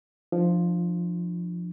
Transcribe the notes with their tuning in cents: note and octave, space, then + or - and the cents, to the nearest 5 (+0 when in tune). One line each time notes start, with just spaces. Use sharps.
F3 +0 D4 +35